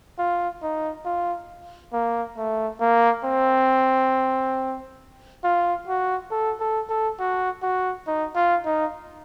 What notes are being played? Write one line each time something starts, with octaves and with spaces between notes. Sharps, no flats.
F4
D#4
F4
A#3
A3
A#3
C4
F4
F#4
A4
A4
A4
F#4
F#4
D#4
F4
D#4